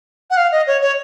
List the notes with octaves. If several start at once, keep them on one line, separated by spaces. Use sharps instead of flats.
F#5
F5
D#5
C#5
C#5